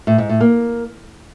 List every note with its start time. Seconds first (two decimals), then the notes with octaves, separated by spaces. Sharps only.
0.07 A2
0.18 G#2
0.29 A2
0.41 A#3